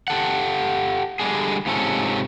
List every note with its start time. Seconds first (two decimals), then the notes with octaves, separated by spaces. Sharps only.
0.08 G4 A4 F#5
1.20 D3 G3 G#3 D4 G#4
1.66 G#2 C3 F3 C#4 A4